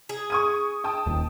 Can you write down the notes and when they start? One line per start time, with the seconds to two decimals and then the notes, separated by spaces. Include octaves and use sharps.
0.09 G#4
0.30 C#6 D#6 D#7
0.84 G5 A5 D#6
1.06 D#1 D#2